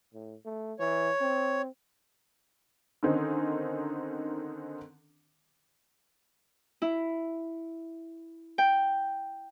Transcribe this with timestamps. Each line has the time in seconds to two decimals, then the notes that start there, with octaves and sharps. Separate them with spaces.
0.14 A2
0.45 A3
0.79 E3 C#5
1.21 C4
3.03 D3 D#3 C4 C#4 D#4
6.82 E4
8.58 G5